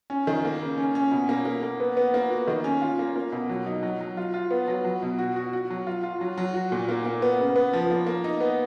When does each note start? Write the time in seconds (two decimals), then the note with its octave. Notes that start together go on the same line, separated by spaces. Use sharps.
0.10 C#4
0.27 D#3
0.45 A#3
0.62 C#3
0.78 C#4
0.95 C#4
1.11 B2
1.29 A#3
1.45 A#3
1.63 A#3
1.80 B3
1.97 B3
2.14 A#3
2.30 F#4
2.48 D#3
2.64 C#4
2.81 F4
2.99 A#3
3.16 A#3
3.32 B2
3.49 F#3
3.66 D#4
3.83 F#3
4.01 F#3
4.17 F4
4.34 F4
4.51 B3
4.68 F#3
4.84 F#3
5.03 B2
5.19 F#4
5.36 F#4
5.53 F#4
5.70 F#3
5.87 F4
6.03 F4
6.21 F#3
6.38 F#3
6.54 F#4
6.72 A#2
6.89 A#3
7.06 A#3
7.22 B3
7.39 C#3
7.56 B3
7.73 F3
7.91 A#3
8.07 A#3
8.24 D#4
8.40 B3